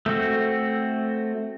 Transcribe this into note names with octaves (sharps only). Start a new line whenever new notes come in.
A3 C4 F#4